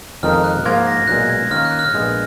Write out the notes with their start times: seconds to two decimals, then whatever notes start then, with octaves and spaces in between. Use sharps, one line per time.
0.23 F2 D#3 G#3 D#4 A#4 F6
0.44 F#6
0.65 G#2 F3 A#3 F4 A#4 G#6
0.87 A#6
1.08 B1 A#2 G#3 F#6
1.30 G#6
1.50 D#3 A#3 C#4 F4 F6
1.65 F#6
1.79 F6
1.94 A#1 A#2 G#3 B3